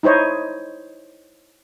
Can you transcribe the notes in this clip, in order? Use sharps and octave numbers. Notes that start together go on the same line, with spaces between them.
D#4 E4 C5 C#5 D#5